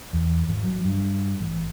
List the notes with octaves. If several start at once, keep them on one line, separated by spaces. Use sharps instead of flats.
E2
G#1
F#3
G2
A1